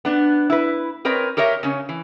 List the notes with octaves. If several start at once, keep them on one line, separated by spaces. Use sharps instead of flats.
B3 D4
E4 B4
C4 A#4 B4 C#5 D#5
G4 A#4 C#5 D#5 E5
C#3 C#4
E3